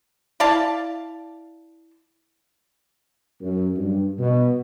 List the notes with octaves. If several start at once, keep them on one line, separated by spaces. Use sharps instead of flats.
E4 D5 F5 A5
F#2
G2
B2